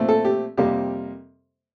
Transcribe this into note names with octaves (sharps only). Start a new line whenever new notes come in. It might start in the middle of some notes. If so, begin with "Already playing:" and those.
Already playing: A#2 A3 C4
A4
G4
F2 C3 G3 A#3 G4